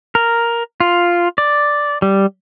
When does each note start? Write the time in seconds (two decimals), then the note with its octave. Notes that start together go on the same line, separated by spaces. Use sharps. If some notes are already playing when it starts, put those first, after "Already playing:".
0.15 A#4
0.80 F4
1.38 D5
2.02 G3